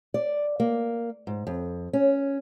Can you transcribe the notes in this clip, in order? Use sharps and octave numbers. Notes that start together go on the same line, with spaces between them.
D5
A#3
G#2
F2
C#4